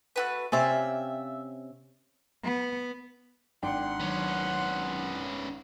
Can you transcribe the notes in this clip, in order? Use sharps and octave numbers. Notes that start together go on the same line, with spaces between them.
A3 F#4 B4
C3 C4 C#4 D5 E5 F5
B3
G#1 D4 F#5 G5 C6 C#7
D#3 F#3 B3 C#4